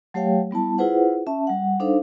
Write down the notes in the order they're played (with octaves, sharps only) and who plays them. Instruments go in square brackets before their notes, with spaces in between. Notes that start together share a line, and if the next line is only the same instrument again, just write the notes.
[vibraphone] F#3 A3 G4 C#5 F5 G5
G3 B3 E4 A5
E4 F4 G#4 B4 C5 F#5
C#4 E5 A5
G3 F#5
D4 D#4 A4 C5 F5